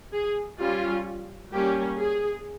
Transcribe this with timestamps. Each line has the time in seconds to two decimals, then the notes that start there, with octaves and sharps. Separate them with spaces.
0.13 G#4
0.59 G3 C#4 F4
1.52 G3 A#3 C#4 G4
1.98 G#4